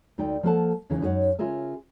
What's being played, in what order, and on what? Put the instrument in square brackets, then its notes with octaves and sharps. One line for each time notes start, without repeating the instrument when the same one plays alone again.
[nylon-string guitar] D2 D#4 D5 G5
F3 A#3 B3 A4 F#5 A5
D#2 C#3 E3 D#4 G#4
F#2 D#4 F#4 C#5 F#5
C#3 F4 G#4 A#4 E5 G#5